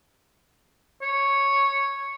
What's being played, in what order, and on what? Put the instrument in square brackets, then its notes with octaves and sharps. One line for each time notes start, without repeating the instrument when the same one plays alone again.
[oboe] C#5